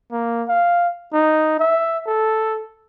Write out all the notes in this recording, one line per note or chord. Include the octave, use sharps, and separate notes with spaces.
A#3
F5
D#4
E5
A4